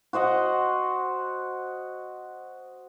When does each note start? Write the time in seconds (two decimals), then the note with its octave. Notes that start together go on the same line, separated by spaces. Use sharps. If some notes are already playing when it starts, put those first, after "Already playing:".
0.13 F#4 C5 D#5 F#5